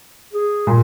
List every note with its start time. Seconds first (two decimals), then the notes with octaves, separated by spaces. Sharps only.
0.33 G#4
0.67 A#2